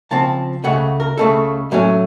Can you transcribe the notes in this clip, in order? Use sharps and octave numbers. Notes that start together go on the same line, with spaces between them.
C#3 F3 C4 A5
C#2 C#3 A3 F#5
A#4
C#2 C#3 A3 A4
A2 F#3 A3 C#4